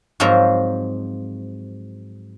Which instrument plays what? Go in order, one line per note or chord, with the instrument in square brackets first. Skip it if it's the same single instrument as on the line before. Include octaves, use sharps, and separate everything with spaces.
[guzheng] G#2 F3 F#3 C4 A#4 A#5